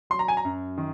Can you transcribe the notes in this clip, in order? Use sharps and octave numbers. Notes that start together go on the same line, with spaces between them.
F#3 C6
A#5
G#5
A#5
F#2
D#3